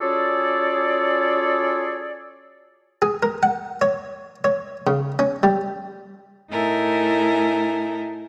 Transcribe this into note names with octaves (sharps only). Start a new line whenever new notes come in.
C#4 F4 F#4 G#4 A4 D5
G#4
A#4
F#5
C#5
C#5
C#3
C#4
G3
A2 D#4 E4 A4 A#4 G#5